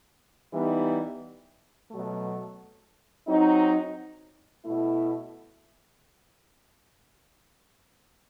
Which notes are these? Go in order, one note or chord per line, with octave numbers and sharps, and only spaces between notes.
E3 G3 B3 D#4
B2 F#3 A3
F#3 C4 D#4
B2 A3 E4